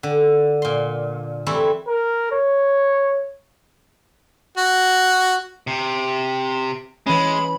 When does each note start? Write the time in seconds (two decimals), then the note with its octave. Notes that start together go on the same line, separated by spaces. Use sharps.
0.03 D3
0.62 A#2 C6
1.46 E3 G3 A3 C4 E4
1.88 A#4
2.32 C#5
4.58 F#4
5.67 C3
7.07 E3 G#3 C#4 B5